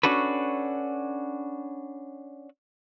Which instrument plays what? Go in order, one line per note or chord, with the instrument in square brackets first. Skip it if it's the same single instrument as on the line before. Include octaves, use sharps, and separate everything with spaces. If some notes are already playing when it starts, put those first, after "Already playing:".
[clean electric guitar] C#4 D4 F#4 A4 B4